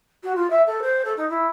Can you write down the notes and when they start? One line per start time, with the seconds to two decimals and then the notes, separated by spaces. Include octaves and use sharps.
0.23 F#4
0.36 F4
0.50 E5
0.66 A4
0.82 C5
1.05 A4
1.17 D#4
1.29 E4